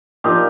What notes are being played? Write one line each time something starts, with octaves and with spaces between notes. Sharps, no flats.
A#2 F3 D#4 G4